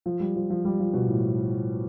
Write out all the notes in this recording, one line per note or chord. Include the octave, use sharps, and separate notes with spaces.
F3
G3
F3
F3
G3
F3
B2
A2